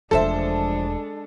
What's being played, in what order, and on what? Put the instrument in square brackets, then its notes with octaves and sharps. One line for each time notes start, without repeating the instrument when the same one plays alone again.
[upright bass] E1 A3 [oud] F3 C5 E5 [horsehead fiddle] G#3 D4 [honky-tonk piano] A4